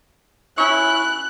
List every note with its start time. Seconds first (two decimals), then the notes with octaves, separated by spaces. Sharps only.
0.58 C#4 E4 C#6 F#6